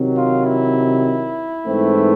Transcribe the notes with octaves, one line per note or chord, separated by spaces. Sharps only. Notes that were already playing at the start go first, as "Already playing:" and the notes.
Already playing: C3 D#3 F#3
F4
E4
G#2 E3 A3 C4